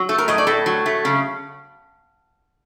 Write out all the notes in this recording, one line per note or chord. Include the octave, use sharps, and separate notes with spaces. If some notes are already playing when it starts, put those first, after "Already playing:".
Already playing: F#3
A3 A4
A#4
A2 D#5
D5
A2 A4
F#3
A3
C#3